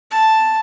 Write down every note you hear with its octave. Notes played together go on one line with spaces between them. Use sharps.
A5